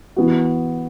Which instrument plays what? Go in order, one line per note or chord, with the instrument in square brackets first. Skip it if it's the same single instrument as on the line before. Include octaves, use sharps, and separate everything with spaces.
[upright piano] E3 B3 F#4